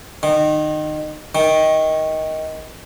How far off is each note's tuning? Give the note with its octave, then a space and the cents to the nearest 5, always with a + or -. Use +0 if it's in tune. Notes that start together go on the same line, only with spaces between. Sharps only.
D#3 -25
D#3 +15